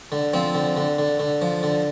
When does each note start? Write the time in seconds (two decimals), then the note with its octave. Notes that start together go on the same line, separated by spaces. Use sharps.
0.12 D3
0.33 F3 C4
0.55 D3
0.77 D3
0.99 D3
1.19 D3
1.42 F3
1.63 D3